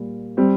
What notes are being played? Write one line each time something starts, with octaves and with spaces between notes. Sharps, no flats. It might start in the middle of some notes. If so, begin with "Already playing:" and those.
Already playing: A#2 G3
G3 C4